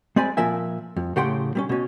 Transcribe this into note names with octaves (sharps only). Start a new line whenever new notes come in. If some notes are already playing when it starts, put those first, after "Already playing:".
G#3 C4 D5 G#5 B5
A#2 F3 A#4 E5 G#5
F2
A2 C#3 G4 F#5 G5 C6
G3 B3 C#4
B2 C#4